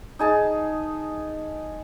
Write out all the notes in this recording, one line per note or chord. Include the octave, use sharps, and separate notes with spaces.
D#4 G#4 A5